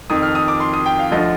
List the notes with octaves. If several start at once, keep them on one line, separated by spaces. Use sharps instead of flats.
F2 D#3 D#6
F6
D#6
D6
C6
D#6
G5
F5
D2 D3 F3 D#5